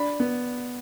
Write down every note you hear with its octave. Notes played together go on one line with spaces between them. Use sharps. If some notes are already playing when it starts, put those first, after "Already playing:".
Already playing: D4 B5
B3